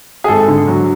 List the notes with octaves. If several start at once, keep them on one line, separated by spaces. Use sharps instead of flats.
G#4
G#1 A4
D3
F#3